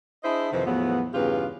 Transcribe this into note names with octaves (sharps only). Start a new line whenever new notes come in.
D4 E4 G#4 C5 D#5 E5
F2 C3 D#3 E3 C4
E2 A2 F3 F#3 B3
E2 G2 C#3 F4 G4 B4